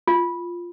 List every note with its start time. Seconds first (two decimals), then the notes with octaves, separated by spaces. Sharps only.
0.08 F4